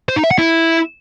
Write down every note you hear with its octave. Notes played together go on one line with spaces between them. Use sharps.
C5
D#4
E5
F#5
E4